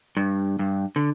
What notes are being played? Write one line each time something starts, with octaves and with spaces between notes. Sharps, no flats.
G2
G2
D3